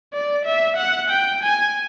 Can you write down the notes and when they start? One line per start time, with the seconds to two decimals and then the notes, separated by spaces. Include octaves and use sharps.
0.13 D5
0.45 E5
0.77 F#5
1.09 G5
1.43 G#5